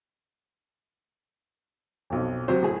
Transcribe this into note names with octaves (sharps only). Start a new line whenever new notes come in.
B1 F2
C3 F#3 F#4 C5
A2 G#4